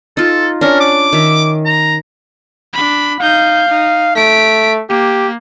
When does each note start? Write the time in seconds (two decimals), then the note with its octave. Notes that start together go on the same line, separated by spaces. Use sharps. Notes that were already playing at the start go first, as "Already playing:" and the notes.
0.17 D#4 F4 A4
0.61 C#4 D4 A#4
0.80 D6
1.13 D#3 E5
1.66 A#5
2.73 D4 B5
3.20 D#4 F5 G6
3.69 D#4
4.16 A3 B6 D7
4.89 A#3 G4